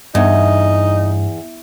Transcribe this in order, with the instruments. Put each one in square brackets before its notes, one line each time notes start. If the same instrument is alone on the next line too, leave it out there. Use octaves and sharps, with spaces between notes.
[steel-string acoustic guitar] E2 [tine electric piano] G2 [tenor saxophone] D#4